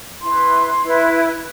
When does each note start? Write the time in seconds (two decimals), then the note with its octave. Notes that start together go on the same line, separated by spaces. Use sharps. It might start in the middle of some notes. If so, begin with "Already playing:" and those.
0.22 E4 B4 C6
0.81 E4 B4